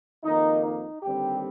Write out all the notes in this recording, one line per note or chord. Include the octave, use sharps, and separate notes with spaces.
F2 D#3 A#3 D#4
D#4
D#2 D3 G3 C4 G4